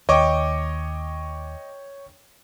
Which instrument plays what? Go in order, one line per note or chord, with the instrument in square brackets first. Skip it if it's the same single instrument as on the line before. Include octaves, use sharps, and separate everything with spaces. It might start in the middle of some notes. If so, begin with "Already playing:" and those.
[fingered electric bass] D#2 [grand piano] C#5 G5 [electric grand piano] D#5 C#6 D6